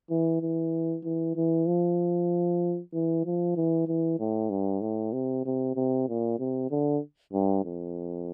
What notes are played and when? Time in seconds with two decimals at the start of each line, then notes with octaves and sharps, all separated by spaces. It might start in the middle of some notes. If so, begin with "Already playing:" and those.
0.10 E3
0.41 E3
1.04 E3
1.36 E3
1.67 F3
2.93 E3
3.25 F3
3.56 E3
3.88 E3
4.19 A2
4.50 G2
4.81 A2
5.13 C3
5.45 C3
5.76 C3
6.08 A#2
6.40 C3
6.71 D3
7.33 G2
7.65 F2